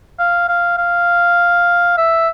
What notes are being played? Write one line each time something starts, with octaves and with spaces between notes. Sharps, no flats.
F5
F5
F5
E5